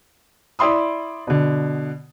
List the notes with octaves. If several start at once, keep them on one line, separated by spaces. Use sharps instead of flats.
E4 D5 E5 C6 D#6
B2 D3